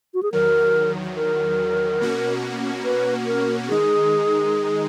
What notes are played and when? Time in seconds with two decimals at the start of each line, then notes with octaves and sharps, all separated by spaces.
0.14 F#4
0.23 G#4
0.32 E2 D#3 F#3 A#4
1.16 A#4
2.01 B2 A#3 C#4 F#4
2.85 B4
3.26 A#4
3.68 D#3 G#3 D#4 G#4